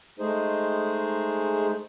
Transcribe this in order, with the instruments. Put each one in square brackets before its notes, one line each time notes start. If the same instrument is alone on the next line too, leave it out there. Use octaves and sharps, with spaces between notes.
[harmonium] G#3 A3 D#4 G#4 C5